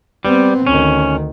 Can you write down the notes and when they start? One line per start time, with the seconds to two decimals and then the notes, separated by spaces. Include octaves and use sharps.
0.25 G3 B3 C4
0.67 D2 D#3 C#4